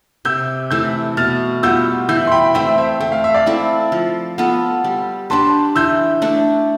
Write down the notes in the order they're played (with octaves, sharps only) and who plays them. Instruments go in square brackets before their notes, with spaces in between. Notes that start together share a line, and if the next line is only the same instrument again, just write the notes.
[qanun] C3 [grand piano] E6 G6
[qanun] E3 A3 [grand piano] E6 G6
[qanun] B2 [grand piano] F6 A6
[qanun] G3 B3 F4 [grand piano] E6 G6
[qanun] E3 [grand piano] E6 G6
[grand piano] C6
G5 B5
[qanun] A3 C4 E4 [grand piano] E5 G5
[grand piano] C5 E5
[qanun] A3 [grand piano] G5
[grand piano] F5
E5
D5 F5
[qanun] C4 E4 A4
F3
B3 F4 A4
G3
[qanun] D4 G4 B4 [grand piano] A5 C6
[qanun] E3 [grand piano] E6 G6
[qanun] A3 D4 A4